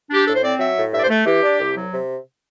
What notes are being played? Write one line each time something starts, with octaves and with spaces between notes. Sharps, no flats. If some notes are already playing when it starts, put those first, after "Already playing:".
D4
G4
A2 A4
C5
C4 D5
F#3 E5
A2
G2 E5
D5
C5
A3
E3 G4
D4
C2
F#3
C3